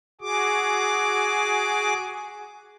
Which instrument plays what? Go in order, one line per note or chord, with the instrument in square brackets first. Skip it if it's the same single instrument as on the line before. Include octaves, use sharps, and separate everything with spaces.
[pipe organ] F#4 G#4 D6